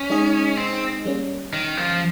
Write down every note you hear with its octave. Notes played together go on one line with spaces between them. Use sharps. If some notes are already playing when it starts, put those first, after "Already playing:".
Already playing: C#4
G#3 D#4 G#4 D#5
C4
G3 A#3 C#4
D#3
F3